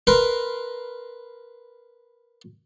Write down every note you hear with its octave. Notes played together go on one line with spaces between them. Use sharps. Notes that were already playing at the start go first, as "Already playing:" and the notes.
A#4 B4 C6